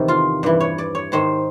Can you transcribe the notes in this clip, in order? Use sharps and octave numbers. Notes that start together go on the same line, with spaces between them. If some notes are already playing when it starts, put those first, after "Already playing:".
Already playing: E2 C3 D#3
F4
G2 E3
C#5
D5
C#5
G#2 D#3 C5